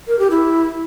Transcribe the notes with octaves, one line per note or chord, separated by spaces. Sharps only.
A#4
G4
E4